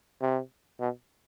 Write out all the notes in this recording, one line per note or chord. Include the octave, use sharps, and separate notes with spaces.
C3
B2